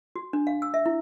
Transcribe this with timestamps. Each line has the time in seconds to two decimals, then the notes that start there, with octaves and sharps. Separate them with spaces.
0.16 F#4
0.33 D4
0.47 F5
0.62 E6
0.74 E5
0.86 E4